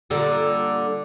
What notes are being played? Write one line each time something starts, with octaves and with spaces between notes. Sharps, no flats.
A#2 D3 G3